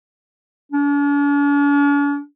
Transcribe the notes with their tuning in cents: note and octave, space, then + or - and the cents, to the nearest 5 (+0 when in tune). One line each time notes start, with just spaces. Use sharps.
D4 -45